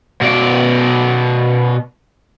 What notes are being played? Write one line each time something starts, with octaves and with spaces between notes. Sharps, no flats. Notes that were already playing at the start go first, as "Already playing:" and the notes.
B2 D5